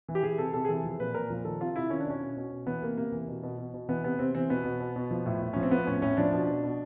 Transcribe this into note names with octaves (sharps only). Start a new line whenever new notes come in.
E3
G4
E3 G#4
C3 A4
C3 A4
G#4
E3 A4
F3
A#2 B4
A#2 A#4
F3
D#3 A4
C3 F4
C3 E4
D#3 C#4
D4
B2 C#4
B2
B2
B2
E3 B3
C3 A#3
C3 A#3
E3
B2
B2
B2
B2
E3 B3
C3 B3
C3 C4
E3 C4
B2 B3
B2
B2
B2
F3
A2
A2
F3 C#4
C4
F3 B3
A2 C#4
A2 C#4
F3 D4
B2
B2
B2